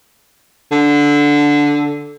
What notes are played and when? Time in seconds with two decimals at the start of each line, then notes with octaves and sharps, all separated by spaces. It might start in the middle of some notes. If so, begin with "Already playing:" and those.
0.72 D3